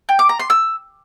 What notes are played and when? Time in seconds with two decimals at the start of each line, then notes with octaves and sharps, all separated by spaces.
0.09 G5
0.19 D6
0.29 A#5
0.40 C6
0.50 E6